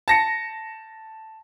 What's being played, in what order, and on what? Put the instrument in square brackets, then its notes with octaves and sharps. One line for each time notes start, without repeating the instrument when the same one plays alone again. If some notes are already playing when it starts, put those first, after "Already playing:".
[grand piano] A5 A#6 C#7